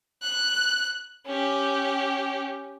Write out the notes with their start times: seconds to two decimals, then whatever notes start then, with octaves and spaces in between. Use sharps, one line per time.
0.22 F#6
1.26 C#4 G4